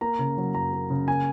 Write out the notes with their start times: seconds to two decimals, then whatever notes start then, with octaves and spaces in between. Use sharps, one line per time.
0.01 A#3 A#5
0.19 C#3
0.38 F#3
0.54 F#2 A#5
0.73 A#3
0.90 C#3
1.08 A#3 G#5